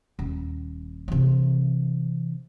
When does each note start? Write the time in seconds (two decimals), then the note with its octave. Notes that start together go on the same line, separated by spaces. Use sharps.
0.19 D#1
1.08 C3 E3